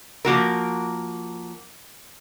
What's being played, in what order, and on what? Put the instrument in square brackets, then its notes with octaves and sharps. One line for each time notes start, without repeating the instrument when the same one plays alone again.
[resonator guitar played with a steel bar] F3 A#3 F#4 A#4